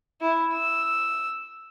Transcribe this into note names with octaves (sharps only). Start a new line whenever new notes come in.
E4
E6